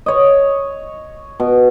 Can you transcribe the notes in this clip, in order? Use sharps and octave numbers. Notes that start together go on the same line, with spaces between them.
C#5 D#5
B2